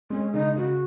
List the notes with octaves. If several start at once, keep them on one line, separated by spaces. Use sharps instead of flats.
G#3 C#4
C#3 D#4
C#3 F#4